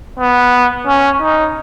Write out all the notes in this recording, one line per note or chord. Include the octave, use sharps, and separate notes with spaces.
B3
C#4
D#4